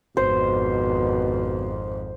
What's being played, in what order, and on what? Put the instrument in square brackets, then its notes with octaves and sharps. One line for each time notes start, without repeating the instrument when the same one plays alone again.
[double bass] G#1 F2 [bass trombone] B2 [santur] C5